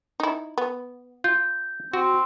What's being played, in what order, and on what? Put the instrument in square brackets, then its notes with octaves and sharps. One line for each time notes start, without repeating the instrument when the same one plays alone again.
[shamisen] D#4 E4
B3
[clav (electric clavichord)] F4 [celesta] G6
[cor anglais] C4 [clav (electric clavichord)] F#4